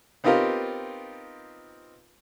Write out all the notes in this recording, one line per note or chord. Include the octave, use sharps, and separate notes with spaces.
B3 C4 D#4 F4 G4 A#4